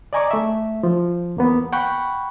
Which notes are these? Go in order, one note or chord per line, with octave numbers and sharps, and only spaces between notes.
D5 D#5 G#5 A#5 C#6 D6
A3 E5
F3
E2 A#3 B3
F#5 G5 B5 C#6 F#6